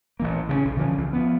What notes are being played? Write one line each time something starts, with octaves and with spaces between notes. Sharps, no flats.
A1 E3 A#3
C#3 A#3 C#4
B1
D3 E3 F3 C#4
C#2 E3
F3 B3